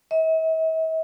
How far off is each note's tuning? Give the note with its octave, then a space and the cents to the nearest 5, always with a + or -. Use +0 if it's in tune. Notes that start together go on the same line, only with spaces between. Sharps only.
E5 -45